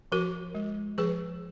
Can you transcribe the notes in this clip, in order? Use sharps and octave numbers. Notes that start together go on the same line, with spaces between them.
F3 F#4 A#4
G#3
F3 G#4 B4